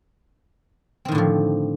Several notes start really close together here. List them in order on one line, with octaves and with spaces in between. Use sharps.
C4 D#3 A2 D3 F3